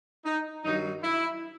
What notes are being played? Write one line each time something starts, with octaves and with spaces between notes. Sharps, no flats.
D#4
G2 D#3 F#3 D#4
E4